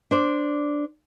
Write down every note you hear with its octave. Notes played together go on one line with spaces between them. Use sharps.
D4 C5 D5